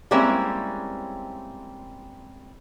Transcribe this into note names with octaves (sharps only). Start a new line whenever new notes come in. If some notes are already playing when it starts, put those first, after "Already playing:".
G3 G#3 A#3 C4 C#4 E4